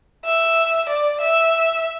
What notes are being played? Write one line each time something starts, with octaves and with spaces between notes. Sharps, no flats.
E5
D5
E5